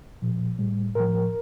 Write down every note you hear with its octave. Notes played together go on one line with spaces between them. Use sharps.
A#2 F3
A2 G3
A2 F3 A#4